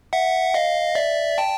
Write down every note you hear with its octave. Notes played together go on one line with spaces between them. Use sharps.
E5 F#5
D#5 F5
D5 E5
G5 A5